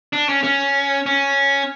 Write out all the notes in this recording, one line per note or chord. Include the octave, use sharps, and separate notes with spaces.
D4
C#4
C#4
C#4